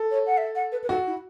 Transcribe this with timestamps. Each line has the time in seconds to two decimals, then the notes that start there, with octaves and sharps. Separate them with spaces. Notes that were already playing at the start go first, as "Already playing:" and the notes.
Already playing: A4
0.10 C#5
0.26 F#5
0.37 E5
0.55 F#5
0.71 B4
0.83 B4
0.89 F#4 A4
1.06 E4